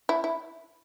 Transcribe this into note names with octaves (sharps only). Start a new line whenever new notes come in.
E4
E4